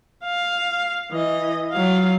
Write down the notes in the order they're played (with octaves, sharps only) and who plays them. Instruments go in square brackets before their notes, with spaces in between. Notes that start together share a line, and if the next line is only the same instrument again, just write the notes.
[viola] F5
E3 D#5
F#3 F5